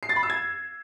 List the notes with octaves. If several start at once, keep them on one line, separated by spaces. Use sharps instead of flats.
C7
A6
B5
E6
G#6